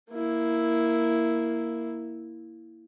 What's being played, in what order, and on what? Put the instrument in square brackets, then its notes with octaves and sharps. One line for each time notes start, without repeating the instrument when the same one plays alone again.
[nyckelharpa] A#3 E4